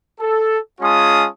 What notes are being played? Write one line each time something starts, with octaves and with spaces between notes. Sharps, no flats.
A4
G#3 C#4 F4 A5 D#6